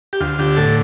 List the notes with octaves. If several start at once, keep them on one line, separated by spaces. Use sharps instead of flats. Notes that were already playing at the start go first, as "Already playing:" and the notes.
G4
D2 F4
D3 G4
A2 A4